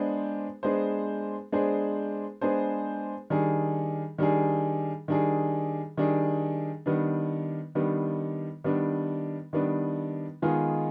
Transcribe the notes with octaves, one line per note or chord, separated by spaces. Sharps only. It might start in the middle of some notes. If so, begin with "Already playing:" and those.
Already playing: G#3 B3 D4 G#4 C5
G#3 B3 D4 G#4 C5
G#3 B3 D4 G#4 C5
G#3 B3 D4 G#4 C5
D#3 G3 D4 G#4
D#3 G3 D4 G#4
D#3 G3 D4 G#4
D#3 G3 D4 G#4
D#3 G3 B3 D4
D#3 G3 B3 D4
D#3 G3 B3 D4
D#3 G3 B3 D4
D#3 G#3 B3 F4 G#4